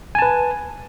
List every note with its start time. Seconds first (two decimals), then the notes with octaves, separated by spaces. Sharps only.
0.15 G#5
0.19 A5
0.22 B4